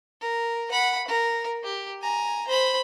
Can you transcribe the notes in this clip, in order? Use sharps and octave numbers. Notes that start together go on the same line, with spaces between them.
A#4
F#5 B5
A#4
G4
G#5 A#5
C5 B5